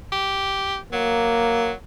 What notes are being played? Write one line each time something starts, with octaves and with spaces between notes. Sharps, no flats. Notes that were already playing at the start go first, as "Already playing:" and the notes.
G4
F#3 A#3